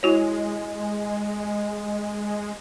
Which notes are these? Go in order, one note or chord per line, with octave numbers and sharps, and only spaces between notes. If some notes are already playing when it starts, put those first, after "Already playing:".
G#3 E4 F#4 C#5